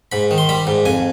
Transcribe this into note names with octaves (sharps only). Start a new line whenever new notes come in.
G#2 B5
D#3
C6
G3 B5
G#2
F2 G#5